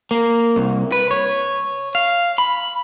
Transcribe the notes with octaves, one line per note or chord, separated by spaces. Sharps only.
A#3
C2
B4
C#5
F5
B5